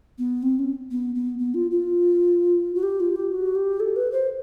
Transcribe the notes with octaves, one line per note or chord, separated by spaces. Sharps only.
B3
C4
C#4
B3
B3
B3
F4
F4
F#4
G4
F4
G4
F#4
G4
A4
B4
C5